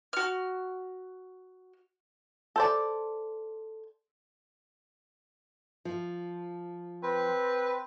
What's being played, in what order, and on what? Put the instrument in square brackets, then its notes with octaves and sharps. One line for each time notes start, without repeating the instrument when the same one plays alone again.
[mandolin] F#4 F6
[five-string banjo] A4 C5 D5
[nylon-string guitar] F3
[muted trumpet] C4 [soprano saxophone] B4